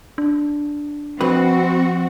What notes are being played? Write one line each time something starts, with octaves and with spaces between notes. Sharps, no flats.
D4
F2 C4 F#4 B4